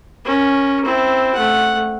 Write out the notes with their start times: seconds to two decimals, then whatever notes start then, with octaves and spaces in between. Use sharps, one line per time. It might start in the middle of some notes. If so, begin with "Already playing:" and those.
0.25 C#4 A#4
0.85 C4 E4
1.34 A3 F#5